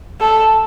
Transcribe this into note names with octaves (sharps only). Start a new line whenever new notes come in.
A4